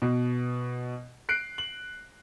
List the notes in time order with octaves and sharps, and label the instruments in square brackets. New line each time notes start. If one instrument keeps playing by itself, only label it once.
[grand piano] B2
F#6 C7 D7
F#7